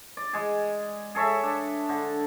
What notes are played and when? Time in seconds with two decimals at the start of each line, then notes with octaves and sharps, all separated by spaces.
0.17 D5
0.33 G#3 G#4
1.15 G#4 A4 C#5 E5
1.43 D4
1.89 D3